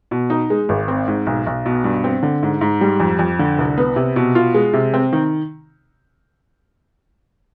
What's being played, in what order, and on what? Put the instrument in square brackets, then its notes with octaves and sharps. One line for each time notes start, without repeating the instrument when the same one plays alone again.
[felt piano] B2
D#4
G#3
G#1
C4
G#2
B1
B1
B2
G2
C4
D3
G#2
G#2
G3
F2
F2
D3
C2
B3
C3
B2
F4
G#3
C3
C4
D#3